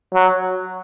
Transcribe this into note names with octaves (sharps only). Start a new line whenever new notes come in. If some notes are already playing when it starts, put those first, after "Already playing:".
F#3